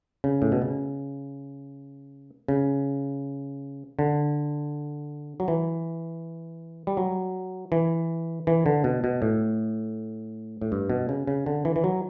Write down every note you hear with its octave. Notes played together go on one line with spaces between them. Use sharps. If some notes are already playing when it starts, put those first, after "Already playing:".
C#3
A2
B2
C#3
C#3
D3
F#3
E3
G3
F#3
E3
E3
D3
B2
B2
A2
A2
G2
B2
C#3
C#3
D3
E3
E3
F#3